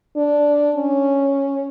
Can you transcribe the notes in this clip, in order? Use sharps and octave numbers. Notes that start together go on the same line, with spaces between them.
D4
C#4